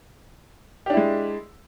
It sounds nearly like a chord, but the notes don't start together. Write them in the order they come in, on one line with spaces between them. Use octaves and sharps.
G4 D4 E4 G#3